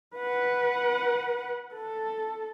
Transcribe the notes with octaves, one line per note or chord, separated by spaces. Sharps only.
B4 F#5
A4